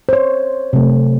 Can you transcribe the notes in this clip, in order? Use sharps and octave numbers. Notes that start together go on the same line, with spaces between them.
C5
C#5
C3 F#3 A3